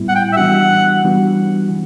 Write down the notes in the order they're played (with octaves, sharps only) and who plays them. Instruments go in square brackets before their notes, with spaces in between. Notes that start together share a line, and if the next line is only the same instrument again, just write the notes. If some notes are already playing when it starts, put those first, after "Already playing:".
Already playing: [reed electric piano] A2 G3 B3 E4
[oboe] F#5
G5
E5
[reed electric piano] E3 G3 B3 D4 F#4 [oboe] F#5
[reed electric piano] E3 G3 B3 D4 F#4
E3